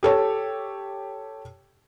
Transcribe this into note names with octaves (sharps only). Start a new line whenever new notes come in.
G4 A4 C#5